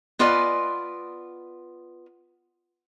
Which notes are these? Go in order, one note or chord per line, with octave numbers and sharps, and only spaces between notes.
B3 F4 B4 D5 D#5 G#5